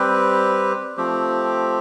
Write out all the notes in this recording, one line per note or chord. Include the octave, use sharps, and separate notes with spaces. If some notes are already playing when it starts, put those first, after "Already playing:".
Already playing: G3 C4 G4 B4
F3 A3 C4 G4